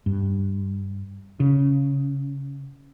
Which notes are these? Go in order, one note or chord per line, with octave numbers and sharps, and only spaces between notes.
G2
C#3